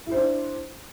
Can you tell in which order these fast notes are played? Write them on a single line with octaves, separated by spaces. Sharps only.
E4 C5 D4